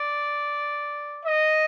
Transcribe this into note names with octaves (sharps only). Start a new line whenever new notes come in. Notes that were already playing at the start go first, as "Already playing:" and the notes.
Already playing: D5
D#5